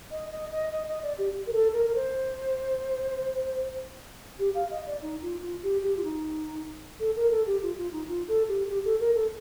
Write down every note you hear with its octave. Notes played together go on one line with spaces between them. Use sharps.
D#5
D#5
D#5
D#5
D#5
D5
G4
A#4
A4
A#4
A#4
C5
G4
F5
D#5
D5
D#4
F4
F4
G4
G4
F4
D#4
A4
A#4
A4
G4
F4
F4
D#4
F4
A4
G4
G4
A4
A#4
A4